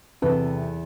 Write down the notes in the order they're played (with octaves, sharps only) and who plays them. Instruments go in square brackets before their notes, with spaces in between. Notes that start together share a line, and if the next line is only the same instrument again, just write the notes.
[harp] E2 [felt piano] C3 [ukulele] A4 B4